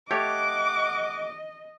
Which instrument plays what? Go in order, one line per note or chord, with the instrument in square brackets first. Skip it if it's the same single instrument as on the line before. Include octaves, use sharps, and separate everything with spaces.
[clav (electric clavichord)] A3 G4 C#5 [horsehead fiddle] D#5 [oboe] F#5 [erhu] D6